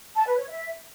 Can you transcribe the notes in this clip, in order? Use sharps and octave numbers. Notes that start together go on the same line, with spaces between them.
A5
B4
C#5
E5